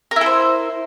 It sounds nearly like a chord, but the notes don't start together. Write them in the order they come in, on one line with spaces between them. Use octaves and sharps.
A#4 E4 A4 C5